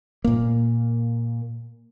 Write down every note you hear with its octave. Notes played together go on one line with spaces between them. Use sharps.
A#2 A#3